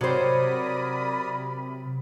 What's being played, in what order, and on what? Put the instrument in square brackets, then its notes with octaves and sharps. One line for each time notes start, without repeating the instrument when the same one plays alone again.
[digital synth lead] C3 [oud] F#3 C5 [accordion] A#4 D5 D#6 [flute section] B5